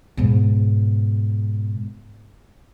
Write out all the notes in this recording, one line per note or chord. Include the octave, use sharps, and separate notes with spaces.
G#2 B2